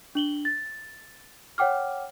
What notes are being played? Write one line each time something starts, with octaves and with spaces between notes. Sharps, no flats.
D4 F#7 G7
A6
C#5 F#5 G5 D6 F6